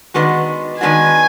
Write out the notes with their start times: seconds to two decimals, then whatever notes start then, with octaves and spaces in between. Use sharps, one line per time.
0.14 D#3 G#3 B3 D4 F#4
0.81 D#3 G#3 B3 D4 F#4 G#5